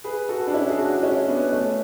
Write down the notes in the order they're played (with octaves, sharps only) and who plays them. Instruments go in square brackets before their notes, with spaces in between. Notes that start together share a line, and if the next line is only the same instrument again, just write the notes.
[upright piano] G#4 B4
F#4 A4
D4
C#4 E4
G#4
D4 F#4
C#4 E4
B3 D4
A3 C#4